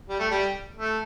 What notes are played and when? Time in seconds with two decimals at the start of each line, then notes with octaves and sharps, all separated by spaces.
0.09 G3
0.19 A3
0.31 G3
0.77 A3